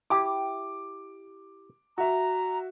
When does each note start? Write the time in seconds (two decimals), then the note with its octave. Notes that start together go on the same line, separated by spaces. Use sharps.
0.10 E4 G4 D6
1.98 F#4 E5 A#5